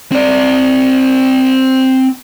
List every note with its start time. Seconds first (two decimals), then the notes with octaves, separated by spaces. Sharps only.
0.12 C4 D5